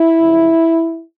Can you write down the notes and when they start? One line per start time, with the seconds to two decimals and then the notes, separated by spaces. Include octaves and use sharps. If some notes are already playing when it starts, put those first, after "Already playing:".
Already playing: E4
0.19 F#2 C#3 F3